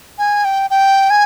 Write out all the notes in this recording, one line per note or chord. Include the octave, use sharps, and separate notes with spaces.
G#5
G5
G5
G#5